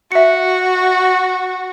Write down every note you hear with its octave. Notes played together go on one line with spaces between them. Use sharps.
F#4 E5 C#7